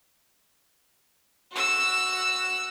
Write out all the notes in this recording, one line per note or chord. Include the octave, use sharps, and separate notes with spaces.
F#4 E6